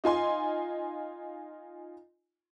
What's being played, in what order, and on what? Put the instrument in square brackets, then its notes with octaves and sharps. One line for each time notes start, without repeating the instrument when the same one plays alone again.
[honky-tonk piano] D#4 F4 G#5 C6